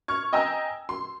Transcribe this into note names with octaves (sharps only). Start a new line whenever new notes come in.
C#6 F6 G#6
D#5 G5 G#5 A#5 E6
C6